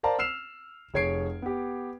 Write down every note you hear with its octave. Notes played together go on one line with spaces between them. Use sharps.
A#4 C5 D5 F5 A5 A#5
E6 F6 C7 E7 F7
F1 G#4 C#5 G#6 C7 D7
B3 G4